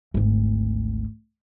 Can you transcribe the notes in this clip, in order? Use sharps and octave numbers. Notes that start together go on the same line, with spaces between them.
G#1 D2